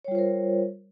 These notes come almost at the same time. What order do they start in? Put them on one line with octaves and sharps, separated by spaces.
C#5 G3 F4 C5 A#4